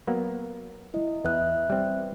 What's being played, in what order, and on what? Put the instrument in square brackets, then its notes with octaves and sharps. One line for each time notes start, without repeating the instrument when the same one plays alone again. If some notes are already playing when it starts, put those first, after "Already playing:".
[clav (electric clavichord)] F#3 A#3 B3
[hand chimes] E4 D#5
[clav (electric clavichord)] E2 D#5 [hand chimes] B4 E5 F#6
[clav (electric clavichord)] G3 C4